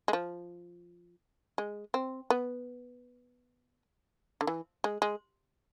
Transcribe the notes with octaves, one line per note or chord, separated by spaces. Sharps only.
G#3
F3
G#3
C4
B3
D3
E3
G#3
G#3